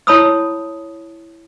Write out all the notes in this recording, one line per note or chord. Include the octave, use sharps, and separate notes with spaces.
E4 C#5 A5 B5 D#6 E6